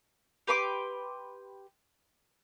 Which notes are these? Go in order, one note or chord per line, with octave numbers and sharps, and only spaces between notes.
G4 B4 C6 D6